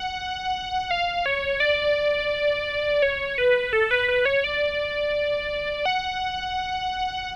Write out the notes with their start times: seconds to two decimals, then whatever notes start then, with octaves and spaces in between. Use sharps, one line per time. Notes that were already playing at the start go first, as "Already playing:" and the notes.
Already playing: F#5
0.91 F5
1.26 C#5
1.60 D5
3.02 C#5
3.38 B4
3.73 A4
3.91 B4
4.08 B4
4.25 C#5
4.44 D5
5.85 F#5